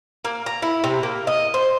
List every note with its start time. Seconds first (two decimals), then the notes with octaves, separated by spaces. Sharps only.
0.25 A#3
0.46 A#5
0.62 E4
0.84 C3
1.03 A#3
1.27 D#5
1.54 C5